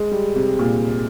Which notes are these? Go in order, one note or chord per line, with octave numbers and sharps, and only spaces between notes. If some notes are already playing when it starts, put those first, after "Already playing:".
Already playing: G#3
G3
C3
A#2